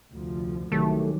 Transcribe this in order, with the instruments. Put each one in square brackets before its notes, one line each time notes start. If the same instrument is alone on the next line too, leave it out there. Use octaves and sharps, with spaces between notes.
[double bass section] F1 D2 F3
[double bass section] C2 C3 E3 [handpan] D#3 F#3 G4 [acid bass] A3